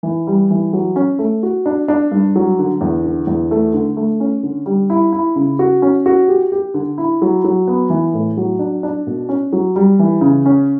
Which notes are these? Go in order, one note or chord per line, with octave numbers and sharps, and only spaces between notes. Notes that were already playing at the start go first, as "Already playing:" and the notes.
E3
G3
E3
F#3
C#4
A3
F#4
D4
D4
G2
F#3
D3
E2
D3
E2
A3
D3
A3
C#4
D3
G3
E4
E4
C#3
F#4
C#4
F#4
G4
G4
D3
E4
F#3
F#3
B3
E3
A2
F#3
D4
D4
B2
C#4
F#3
G3
E3
C#3
C#4